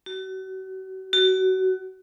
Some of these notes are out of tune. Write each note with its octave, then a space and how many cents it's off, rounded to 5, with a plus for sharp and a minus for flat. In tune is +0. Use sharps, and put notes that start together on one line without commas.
F#4 +40
F#4 +25